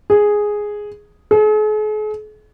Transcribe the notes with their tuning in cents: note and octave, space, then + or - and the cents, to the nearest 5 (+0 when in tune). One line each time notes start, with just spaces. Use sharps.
G#4 +0
G#4 +45